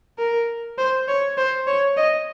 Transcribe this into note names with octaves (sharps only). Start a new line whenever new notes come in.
A#4
C5
C#5
C5
C#5
D#5